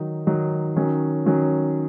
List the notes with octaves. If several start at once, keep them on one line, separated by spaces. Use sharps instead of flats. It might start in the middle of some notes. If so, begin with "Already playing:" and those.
Already playing: D#3 F#3 D#4
D#3 F#3 D#4
D#3 F#3 C#4
D#3 F#3 C#4